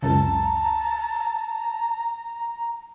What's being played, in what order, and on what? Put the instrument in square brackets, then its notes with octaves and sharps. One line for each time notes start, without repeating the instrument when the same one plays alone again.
[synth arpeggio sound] C#2 F#2 C#3 [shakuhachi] A5 [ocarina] A#5